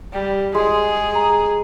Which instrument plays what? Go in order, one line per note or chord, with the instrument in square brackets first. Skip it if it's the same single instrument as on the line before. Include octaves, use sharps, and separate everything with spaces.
[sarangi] G3
[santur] G#3 [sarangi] G#4
[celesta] A#5